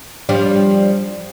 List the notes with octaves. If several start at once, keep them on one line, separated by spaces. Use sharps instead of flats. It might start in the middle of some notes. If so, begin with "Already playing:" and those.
F3 G3 D4